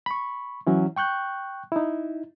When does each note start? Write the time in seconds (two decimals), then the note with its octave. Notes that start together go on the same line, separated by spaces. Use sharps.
0.06 B5 C#6
0.67 E3 F#3 C#4 E4
0.96 G5 C#6 F#6 G6
1.72 D#4 E4